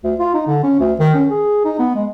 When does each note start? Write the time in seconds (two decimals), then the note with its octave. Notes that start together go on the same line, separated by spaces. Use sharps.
0.04 D2
0.19 F4
0.34 D#4
0.47 D3
0.64 C#4
0.80 D2
1.00 D#3
1.14 C#4
1.30 G#4
1.65 D#4
1.79 B3
1.95 G#3